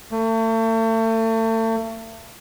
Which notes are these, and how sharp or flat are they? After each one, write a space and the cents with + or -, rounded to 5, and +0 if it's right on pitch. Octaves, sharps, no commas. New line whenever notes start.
A3 +35